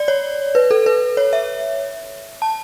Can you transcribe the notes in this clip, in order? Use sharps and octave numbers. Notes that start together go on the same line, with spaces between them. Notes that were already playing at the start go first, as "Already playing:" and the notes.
Already playing: D5
C#5
B4
A4
B4
C#5
E5
A5